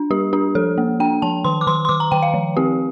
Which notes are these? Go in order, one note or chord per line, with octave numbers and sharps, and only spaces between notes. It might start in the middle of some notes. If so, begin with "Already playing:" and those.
Already playing: D4
G3 G4
D4 G4
F3 A4
A#3
D4 G5
F3 A5
D#3 C6
D6
D#3 C6
C6
D#3 D6
A#5
D#3 G5
F5
F3
C4 G4